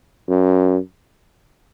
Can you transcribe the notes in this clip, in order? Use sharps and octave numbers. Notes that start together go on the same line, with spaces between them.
F#2